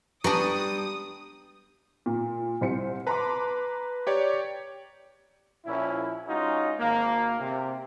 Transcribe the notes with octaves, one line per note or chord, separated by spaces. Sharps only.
G3 B3 D4 B4 A#5 C#6 D#6
A#2
C2 C5 C#7
B4 A5 A#5 C6 D6
G4 C#5 D5
A#1 A#2 C#4 E4
G#3 C#4 D#4 F4 F#4
G#1 A#3
C3